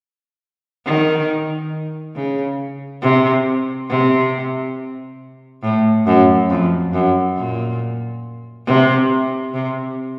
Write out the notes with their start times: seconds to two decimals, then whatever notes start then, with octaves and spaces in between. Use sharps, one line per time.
0.86 D#3
2.15 C#3
3.02 C3
3.89 C3
5.63 A2
6.07 F#2
6.50 F2
6.93 F#2
7.37 A#2
8.67 C3
9.54 C3